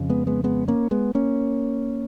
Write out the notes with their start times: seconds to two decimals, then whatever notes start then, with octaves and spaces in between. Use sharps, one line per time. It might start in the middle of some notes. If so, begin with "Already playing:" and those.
Already playing: F2 C#3
0.10 G#3 B3
0.27 G#3 B3
0.44 G#3 B3
0.68 A#3 C#4
0.91 G#3 B3
1.15 A#3 C#4